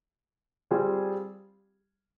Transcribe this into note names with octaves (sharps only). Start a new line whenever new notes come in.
G3 C4 F4 G#4